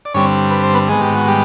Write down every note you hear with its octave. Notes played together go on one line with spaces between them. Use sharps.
D5
G2 D3 G3 C4 C#4 C#5
B4
C5
B3 B4
G#2 D#3 G#3 B3 G#4
G4
F#4
G3 G4